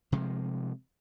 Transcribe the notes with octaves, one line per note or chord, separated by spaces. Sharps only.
C3 F3 G#3